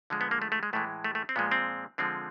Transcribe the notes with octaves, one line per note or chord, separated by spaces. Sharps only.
D3 F3 G#3
B3
A#3
A3
A3
G#3
A2 E3 G#3 A3
A3
A3
C4
A#2 F3 G#3 B3
C4
D3 F3 G#3 C4